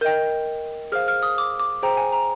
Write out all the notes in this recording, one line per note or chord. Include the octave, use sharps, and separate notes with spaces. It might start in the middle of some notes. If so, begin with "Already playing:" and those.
A#4 D#5 G5 G6
G#4 C5 F5 F6
F6
D#6
D6
D6
G#4 C5 G5 A#5
G#5
A#5